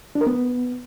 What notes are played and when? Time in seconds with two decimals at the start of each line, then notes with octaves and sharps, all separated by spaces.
0.15 D4
0.21 A#4
0.27 B3